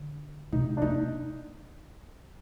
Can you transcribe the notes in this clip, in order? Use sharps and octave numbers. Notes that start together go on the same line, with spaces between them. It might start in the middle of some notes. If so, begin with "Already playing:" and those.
Already playing: D3
C3 D#4
D4
A#3 D#4